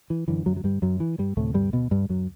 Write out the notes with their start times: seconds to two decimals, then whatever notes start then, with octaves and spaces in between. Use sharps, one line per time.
0.10 E3
0.28 F#2 D3 E3
0.46 F#2 F#3
0.57 F#3
0.64 G2 G3
0.82 F#2 F#3
1.00 E3
1.18 G2 G3
1.37 D2 A2 C3 A3
1.54 G2 G3
1.73 B2 B3
1.91 G2 G3
2.09 F#2 F#3